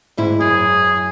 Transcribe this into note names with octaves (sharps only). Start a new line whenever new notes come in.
D2 G#2 E4
F#2 G#4